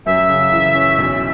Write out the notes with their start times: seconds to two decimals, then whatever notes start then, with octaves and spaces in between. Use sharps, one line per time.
0.06 F#2 E5
0.29 C#3
0.52 E3
0.75 C#4
0.98 B1